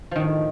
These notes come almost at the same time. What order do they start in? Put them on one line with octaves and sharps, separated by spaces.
F3 D#3 A2